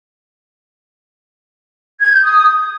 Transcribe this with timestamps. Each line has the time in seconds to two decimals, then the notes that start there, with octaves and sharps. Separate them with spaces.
1.99 G#6
2.11 G6
2.23 D#6